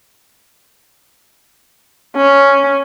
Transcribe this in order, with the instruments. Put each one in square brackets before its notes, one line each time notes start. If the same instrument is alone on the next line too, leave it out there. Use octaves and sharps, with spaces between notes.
[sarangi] C#4